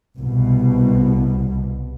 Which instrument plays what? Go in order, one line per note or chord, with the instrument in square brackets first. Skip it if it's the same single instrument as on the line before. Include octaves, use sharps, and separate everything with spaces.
[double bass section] C2 B2